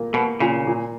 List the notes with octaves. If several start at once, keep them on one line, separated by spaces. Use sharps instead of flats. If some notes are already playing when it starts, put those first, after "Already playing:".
Already playing: A#2 A#3
B2 A#3
A#2 C#3
A#2